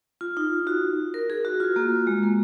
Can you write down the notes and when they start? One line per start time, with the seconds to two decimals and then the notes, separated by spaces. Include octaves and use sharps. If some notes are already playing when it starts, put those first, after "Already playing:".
0.21 F4
0.37 D#4
0.67 F#4
1.14 A#4
1.30 G#4
1.45 F#4
1.60 F4
1.76 A#3
2.07 G#3
2.23 A#3